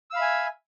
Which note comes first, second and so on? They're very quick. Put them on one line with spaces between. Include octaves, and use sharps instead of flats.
E6 F5 B5 E5 G#5